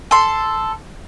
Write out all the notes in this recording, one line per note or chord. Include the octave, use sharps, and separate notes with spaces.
A4 C6